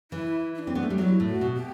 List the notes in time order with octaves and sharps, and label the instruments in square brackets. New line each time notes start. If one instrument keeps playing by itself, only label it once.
[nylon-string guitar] E3 [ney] E4
[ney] E4
D4
[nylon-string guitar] C4
B3
A3
G3
[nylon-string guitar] F#3 [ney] E4 F#4
[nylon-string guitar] A2
[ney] F#4
[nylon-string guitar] B2
[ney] G4